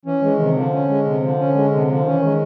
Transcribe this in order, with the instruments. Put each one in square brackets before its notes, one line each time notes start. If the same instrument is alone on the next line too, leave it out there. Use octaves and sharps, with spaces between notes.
[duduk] E3 [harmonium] C#4
[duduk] E3 [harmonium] G#3
[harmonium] C3 [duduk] D#3
[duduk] D3 [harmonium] F3
[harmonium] C#4
G#3
C3
F3
C#4
G#3
C3
F3
[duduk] D#3 [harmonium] C#4
[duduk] E3
[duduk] D#3 [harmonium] G#3